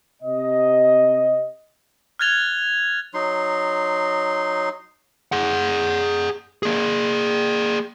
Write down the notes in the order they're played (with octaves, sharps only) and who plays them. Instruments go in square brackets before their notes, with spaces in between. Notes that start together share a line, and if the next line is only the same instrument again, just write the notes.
[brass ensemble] C3 D#5
[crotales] F6 F#6 G#6 A6 F7 G7
[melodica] F#3 D#4 C6
[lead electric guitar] G#4 F#5
A#3 G#4